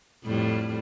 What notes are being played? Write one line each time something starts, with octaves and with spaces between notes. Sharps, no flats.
F2 A2 G3